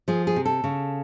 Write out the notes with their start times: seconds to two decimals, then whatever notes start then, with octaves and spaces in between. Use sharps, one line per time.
0.08 F3 G#4
0.27 G#4
0.36 C3
0.45 A4
0.64 C#3